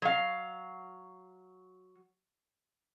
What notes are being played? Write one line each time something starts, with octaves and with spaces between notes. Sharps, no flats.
F#3 F5